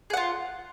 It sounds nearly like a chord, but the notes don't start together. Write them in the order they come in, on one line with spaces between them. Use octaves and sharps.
G#4 F#5 F4